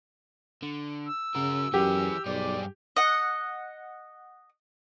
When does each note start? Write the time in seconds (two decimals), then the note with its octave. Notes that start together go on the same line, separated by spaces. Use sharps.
0.62 D3
1.06 E6
1.36 C#3 F#4 A#4
1.74 F#2 E3 G4 G#4
2.26 B1 G2 G#4 D5
2.97 D#5 F#5